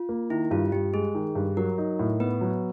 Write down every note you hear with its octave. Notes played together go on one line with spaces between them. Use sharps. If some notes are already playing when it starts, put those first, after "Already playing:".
Already playing: F4
A#3
D#3 E4
G2 F4
G2 G4
G#3 G#4
D#3
G2
F#3 A#4
D#4
A2
B3 B4
F#3